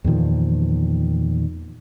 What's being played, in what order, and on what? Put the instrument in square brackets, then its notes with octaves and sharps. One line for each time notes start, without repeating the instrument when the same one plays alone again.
[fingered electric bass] E2 A#2 D#3 F3